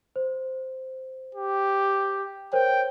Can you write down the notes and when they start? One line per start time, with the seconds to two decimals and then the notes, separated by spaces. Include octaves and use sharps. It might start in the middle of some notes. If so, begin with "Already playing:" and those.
0.16 C5
1.35 G4
2.53 A#4 C5 C#5 G5